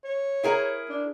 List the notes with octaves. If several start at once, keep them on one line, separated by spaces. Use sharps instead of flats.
C#5
E4 G#4 A#4
D4